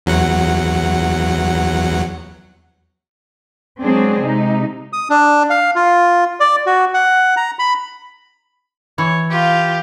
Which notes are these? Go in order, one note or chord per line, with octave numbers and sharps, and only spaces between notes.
E2 F#3 F#5
F#3 G#3 C4 D4 G#4
C3 G#3 D#4
D#6
D4
F5
F4
D5
F#4
F#5
A#5
B5
E3 C#5
F4 G4